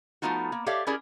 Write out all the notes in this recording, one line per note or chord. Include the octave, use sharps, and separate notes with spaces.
F3 A3 B3 D#4 F4 F#4
A#3
G4 A4 C#5 D5 E5 F5
C#4 E4 G4 G#4 A#4 D5